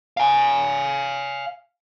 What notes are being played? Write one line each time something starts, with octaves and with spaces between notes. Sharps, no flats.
F5 G#5